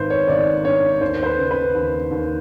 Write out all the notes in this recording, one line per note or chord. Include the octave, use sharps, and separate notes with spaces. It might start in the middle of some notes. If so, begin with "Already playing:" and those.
Already playing: G#1 D#3 B4 C5
C#5
G#1 D5
G2 C#5
D#2 C5
C5
B4
C#3
B4
D#2
D#2